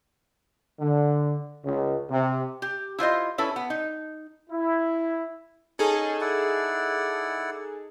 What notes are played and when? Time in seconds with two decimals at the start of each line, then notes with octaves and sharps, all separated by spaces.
0.80 D3
1.65 C#2
2.10 C3
2.62 G4
2.99 E4 F4 C5 D#5
3.38 C#4 E4 A4 B4
3.56 B3
3.70 D#4
4.50 E4
5.79 C#4 D#4 G#4 A4
6.21 E4 D5 F#5